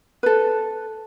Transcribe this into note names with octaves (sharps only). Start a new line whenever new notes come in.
A4 B4